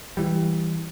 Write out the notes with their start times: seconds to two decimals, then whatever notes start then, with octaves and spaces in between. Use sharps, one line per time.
0.17 E3 G3